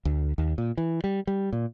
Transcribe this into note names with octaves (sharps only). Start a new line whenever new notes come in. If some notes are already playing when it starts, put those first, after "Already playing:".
D2
D#2
A#2
E3
G3
G3
A#2